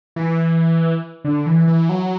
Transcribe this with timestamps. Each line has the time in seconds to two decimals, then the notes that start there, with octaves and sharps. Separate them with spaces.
0.16 E3
1.24 D3
1.46 E3
1.68 E3
1.89 F#3